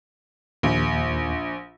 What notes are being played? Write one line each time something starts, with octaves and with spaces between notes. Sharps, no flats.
A#1 D#2